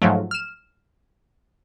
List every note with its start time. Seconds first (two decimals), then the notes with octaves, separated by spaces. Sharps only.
0.02 G#2 F3 F#3 A3
0.31 F6 E7